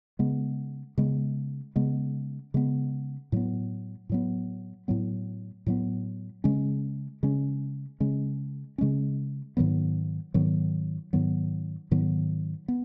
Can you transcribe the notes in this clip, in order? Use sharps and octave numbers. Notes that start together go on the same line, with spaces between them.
C#3 G#3 B3
C#3 G#3 B3
C#3 G#3 B3
C#3 G#3 B3
A2 F#3 B3
A2 F#3 B3
A2 F#3 B3
A2 F#3 B3
C#3 G#3 C#4
C#3 G#3 C#4
C#3 G#3 C#4
C#3 G#3 C#4
G#2 D#3 F#3 B3
G#2 D#3 F#3 B3
G#2 D#3 F#3 B3
G#2 D#3 F#3 B3
B3